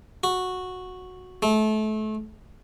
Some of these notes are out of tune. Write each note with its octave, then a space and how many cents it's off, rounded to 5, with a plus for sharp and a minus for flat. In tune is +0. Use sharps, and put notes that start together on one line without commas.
F#4 -10
A3 -30